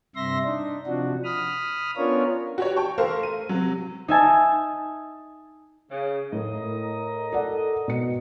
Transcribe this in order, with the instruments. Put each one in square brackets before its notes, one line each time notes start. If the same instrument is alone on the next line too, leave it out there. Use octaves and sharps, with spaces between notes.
[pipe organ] G2 C3 E5 C6 A#6
D4 D#4
C3 F3 D4 F#4
B5 D#6 F6
B3 C#4 D4 F4 A#4 C#5
[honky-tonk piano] F#4 G4 C#5
G5 A5 C#6
A3 A#4 C5 F5
D#7
C3 F#3
[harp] D#4 E5 G#5 A5
[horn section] C#3
[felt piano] A2 [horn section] A#4 D#5
[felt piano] A4 D5 F#5
B2 B4 C#7